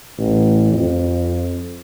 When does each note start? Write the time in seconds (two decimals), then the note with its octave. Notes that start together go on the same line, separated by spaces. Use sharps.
0.18 A1
0.73 F2